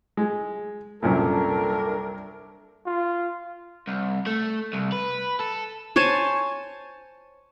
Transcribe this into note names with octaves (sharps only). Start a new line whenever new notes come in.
G#3
C2 F#2 A#2 D4 A4 A#4
F4
C2
A3
C2
B4
A4
C5 C#5 G#5 A5